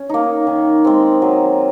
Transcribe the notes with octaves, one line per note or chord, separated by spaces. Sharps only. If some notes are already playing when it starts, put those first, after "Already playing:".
Already playing: C#4
A#3 D#4
D#3
G#3 C4
F#3